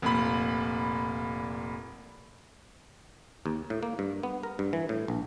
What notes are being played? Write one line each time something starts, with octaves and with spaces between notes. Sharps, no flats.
F1 A#2 B5
D#2
A2
A#3
G2
B3
A#4
G2
E3
A2
A#1